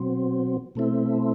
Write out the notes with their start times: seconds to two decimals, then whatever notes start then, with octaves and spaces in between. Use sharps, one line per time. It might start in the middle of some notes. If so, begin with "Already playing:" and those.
Already playing: B2 F#3 C4
0.75 B2 A3 C4 E4